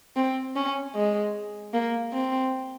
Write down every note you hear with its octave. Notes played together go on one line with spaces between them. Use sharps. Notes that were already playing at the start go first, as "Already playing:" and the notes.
C4
C#4
G#3
A#3
C4